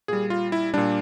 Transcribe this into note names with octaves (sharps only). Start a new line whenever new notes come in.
A#2 G3 G#4
F4
E4
A#2 G3 D4